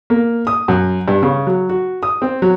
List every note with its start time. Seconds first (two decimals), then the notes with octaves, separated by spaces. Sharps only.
0.10 A#3
0.47 D#6
0.68 F#2
1.08 G2
1.23 C#3
1.47 F#3
1.69 F#4
2.03 D#6
2.22 C4
2.42 F#3